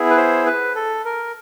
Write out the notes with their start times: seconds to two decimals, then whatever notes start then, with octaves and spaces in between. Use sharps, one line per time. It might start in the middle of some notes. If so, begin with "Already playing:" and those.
Already playing: B3 E4 G#4
0.10 B4
0.17 C5
0.46 B4
0.75 A4
1.05 A#4